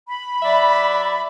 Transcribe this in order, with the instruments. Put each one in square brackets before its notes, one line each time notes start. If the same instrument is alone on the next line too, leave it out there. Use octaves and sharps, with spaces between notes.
[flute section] B5
[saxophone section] F#3 D5 E5